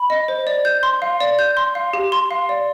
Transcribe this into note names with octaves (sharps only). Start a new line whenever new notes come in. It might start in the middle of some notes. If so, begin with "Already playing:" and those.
Already playing: B5
D#5
C5
D5
G6
C6
F5
D5
G6
C6
F5
G4
C6
F5
D5